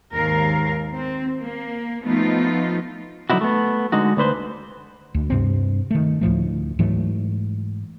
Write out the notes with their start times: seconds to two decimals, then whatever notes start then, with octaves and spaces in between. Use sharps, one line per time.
0.14 D#2 G#2 A#4 F5
0.93 C4
1.40 A#3
2.04 F3 A3 B3 D#4 F4
3.30 D3 F#3 C4 D#4 E4 F#4
3.41 A3 B3
3.92 D3 G#3 D#4 F#4
4.17 D2 D3 B4 C5
5.14 D2
5.30 G2 C3 C4
5.91 D#3 A3
6.21 D2 A2 F3 A3
6.79 G#2 E3 F#3 A3